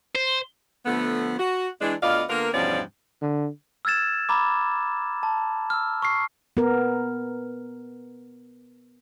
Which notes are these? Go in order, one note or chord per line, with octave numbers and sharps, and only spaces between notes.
C5
D3 F3 A3 B3
F#4
E3 G#3 D4
D2 B3 F4 D5 D#5 F5
D3 A#3 B3 F4 A#4
E2 G2 B2 F3 C#4 D5
D3
E6 F6 G#6 A6 E7
A#5 B5 D6
A5
E6 F6
C#6 F6 C7
B3 A#4